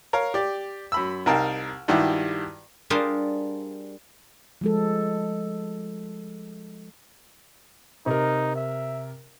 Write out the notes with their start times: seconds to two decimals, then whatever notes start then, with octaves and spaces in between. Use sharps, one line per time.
0.13 A#4 C#5 F5
0.34 G4 D5
0.92 F#2 B5 E6
1.26 C2 D#4 A#4 F5 G5 A5
1.88 G2 D#3 E4 F#4 G4
2.90 G3 D4 F4 G#4 A#4 C5
4.61 F3 G#3 A4
8.06 C3 D#4 A#4
8.56 E5